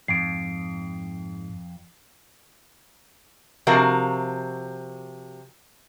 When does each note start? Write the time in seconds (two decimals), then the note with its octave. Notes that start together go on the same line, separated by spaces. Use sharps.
0.08 F2 G#2 C7 D7
3.67 C3 F3 F#4 A#4 F5